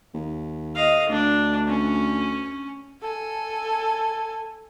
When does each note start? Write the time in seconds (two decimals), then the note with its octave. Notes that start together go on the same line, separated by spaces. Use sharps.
0.14 D#2
0.76 D#5 F5
1.09 D2 D4
1.68 C#4
3.02 A4 G#5